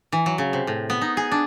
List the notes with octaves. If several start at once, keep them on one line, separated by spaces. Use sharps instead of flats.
E3
F#3
C#3
C3
A2
B3
D#4
G#4
D4